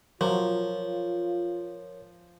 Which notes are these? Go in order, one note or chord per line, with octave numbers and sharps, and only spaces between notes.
F3 F#3 F4 A#4 C#5